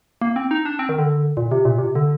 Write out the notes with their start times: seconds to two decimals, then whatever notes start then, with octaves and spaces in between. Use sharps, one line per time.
0.21 A#3
0.36 C4
0.51 D#4
0.65 D4
0.79 C4
0.89 D#3
0.99 D3
1.37 A#2
1.51 C3
1.65 A#2
1.78 C3
1.95 D3